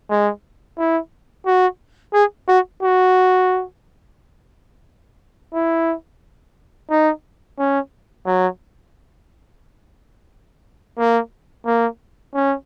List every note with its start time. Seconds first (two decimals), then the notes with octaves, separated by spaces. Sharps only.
0.10 G#3
0.78 E4
1.46 F#4
2.14 G#4
2.48 F#4
2.83 F#4
5.54 E4
6.91 D#4
7.59 C#4
8.27 F#3
10.99 A#3
11.66 A#3
12.34 C#4